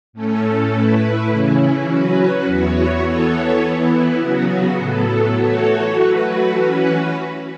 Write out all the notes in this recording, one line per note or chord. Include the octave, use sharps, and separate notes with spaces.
A2 A3 C#4 A4
A2 A3 E4 B4
C#3 E3 C#4 E4
F#3 C#4 F#4 B4
E2 E3 B3 F#4 C#5
E3 B3 A4 C#5
E3 B3 E4
C#3 F#3 B3 F#4
A2 F#3 B3 A4
E3 A3 F#4 A4 C#5
F#3 A3 F#4 B4
E3 C#4 F#4 B4